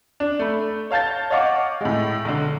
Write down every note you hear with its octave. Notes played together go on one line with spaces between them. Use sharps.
D4
A3 B5
C#5 F5 A5 G6 A6
C#5 D#5 F5 F#5 C#6 D6
A2 G#3
B1 D3